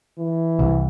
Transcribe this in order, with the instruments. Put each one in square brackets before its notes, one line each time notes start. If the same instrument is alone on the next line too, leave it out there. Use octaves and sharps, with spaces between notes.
[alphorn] E3
[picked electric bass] C2